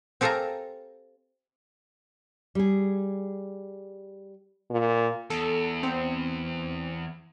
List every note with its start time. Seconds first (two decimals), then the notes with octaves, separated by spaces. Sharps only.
0.21 C4 G4 A4 F5 G#5 A#5
2.55 G3 G#4
4.70 A#2
5.30 E2 A4
5.83 C4